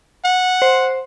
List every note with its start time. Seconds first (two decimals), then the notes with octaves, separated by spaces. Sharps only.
0.25 F#5
0.62 C5